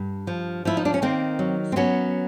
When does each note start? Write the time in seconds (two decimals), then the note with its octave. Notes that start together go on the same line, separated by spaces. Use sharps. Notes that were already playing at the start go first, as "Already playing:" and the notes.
Already playing: G2
0.27 F3
0.65 F3 E4
0.77 D#4
0.85 D4
0.94 C#4
1.02 D#3 A#3 C4
1.39 F#3
1.72 C4
1.76 F#3 B3 C#4